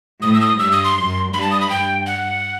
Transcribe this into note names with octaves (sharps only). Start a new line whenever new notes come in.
A2 D#6
E6
D#6
G2 E6
D#6
C6
F#2
G2 B5
A5
D#6
B5
G2 G5
F#5